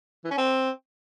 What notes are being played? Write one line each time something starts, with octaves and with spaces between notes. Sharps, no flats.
E3
C#4
C4